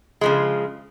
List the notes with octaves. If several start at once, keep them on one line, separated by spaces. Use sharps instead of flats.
C#3 F3 G#3